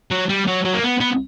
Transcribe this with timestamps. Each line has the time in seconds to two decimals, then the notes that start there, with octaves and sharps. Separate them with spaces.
0.11 F#3
0.29 G3
0.47 F#3
0.65 F#3
0.74 A#3
0.83 B3
1.01 B3